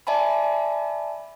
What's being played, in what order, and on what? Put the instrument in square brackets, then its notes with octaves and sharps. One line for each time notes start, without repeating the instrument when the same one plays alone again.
[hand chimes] D5 E5 G#5 A5 B5